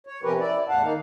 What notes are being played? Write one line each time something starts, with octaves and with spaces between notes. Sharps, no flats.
C#5
C3 F3 C#4 G4 A#4 B4
E4 D5
E2 A2 F5 F#5 A5
D#3 A#3 D#4 F5